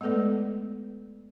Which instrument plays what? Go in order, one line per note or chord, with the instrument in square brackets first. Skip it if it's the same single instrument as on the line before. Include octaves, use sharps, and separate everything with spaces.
[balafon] G#3 A3 B3 A4 B4 D5